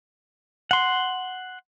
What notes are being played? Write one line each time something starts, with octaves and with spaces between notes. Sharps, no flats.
F#5 C6